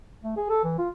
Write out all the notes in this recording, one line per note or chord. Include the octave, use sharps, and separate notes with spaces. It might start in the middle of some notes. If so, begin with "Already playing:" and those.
A3
G#4
A4
E3
F4